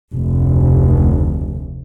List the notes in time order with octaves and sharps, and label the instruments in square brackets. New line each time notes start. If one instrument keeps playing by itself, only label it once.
[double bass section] F1 D2